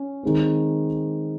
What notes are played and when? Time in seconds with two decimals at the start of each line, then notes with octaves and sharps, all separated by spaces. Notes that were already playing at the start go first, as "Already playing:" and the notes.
Already playing: C#4
0.23 D#3 G#3 C4